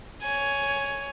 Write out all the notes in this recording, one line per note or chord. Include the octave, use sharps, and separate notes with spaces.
C#5 G#5